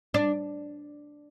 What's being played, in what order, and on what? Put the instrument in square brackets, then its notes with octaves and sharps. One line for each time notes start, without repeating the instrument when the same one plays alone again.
[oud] D4